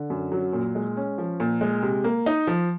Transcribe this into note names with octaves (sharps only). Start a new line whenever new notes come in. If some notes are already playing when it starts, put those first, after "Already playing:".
Already playing: D3
F#2
F#3
A#2
G#3
C#4
F3
A#2
G#3
C3
A#3
D#4
F3